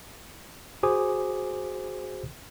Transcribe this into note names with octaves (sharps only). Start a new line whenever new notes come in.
F#4 G#4 C5 G#5 D6 D#6